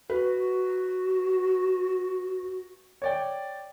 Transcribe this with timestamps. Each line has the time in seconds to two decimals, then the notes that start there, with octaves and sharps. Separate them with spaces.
0.10 F#4 B4
3.02 C#5 D5 G5